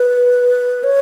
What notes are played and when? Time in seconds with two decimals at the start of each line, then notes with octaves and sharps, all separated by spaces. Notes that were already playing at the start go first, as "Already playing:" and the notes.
Already playing: B4
0.84 C#5